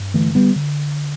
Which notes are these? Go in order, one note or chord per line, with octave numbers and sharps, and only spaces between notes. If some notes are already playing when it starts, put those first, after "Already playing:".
Already playing: G2
D3 E3 A3
G3 B3
D3